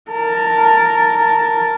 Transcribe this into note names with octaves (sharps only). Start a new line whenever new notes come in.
A#4 A5